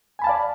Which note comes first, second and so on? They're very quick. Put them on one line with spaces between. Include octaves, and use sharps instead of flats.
G#5 B5 A5 F5 D5